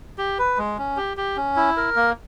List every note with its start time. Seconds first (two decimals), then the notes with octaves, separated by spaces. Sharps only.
0.18 G4
0.39 B4
0.57 G#3
0.78 C#4
0.97 G4
1.17 G4
1.37 C#4
1.56 E4
1.77 A#4
1.96 A#3